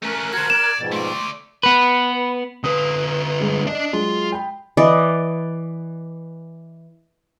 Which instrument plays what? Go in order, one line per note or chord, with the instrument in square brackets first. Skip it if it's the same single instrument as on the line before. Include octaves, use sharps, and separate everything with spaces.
[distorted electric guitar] A3 C#4 [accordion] A#4 F#6
[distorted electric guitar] F#4 C5 [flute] G#6
[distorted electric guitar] D5 [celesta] E7
[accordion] F2 G#2 B2
[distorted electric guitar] A3 D5 [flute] C6
[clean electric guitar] B3 B4
[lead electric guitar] D3 B4 [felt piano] D#6
[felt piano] G2 G#3
[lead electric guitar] D4 A5 [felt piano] D5 D#5
[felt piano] F#3 G#3 [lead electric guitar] F4
[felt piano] G5 B5
[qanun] E3 D5 D#5